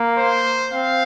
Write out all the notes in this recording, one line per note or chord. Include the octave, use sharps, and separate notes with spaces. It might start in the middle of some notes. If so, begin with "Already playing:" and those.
Already playing: A#3
C5
C4 F5